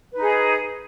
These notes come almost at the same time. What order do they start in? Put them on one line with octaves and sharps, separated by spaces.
B4 D#4 G#4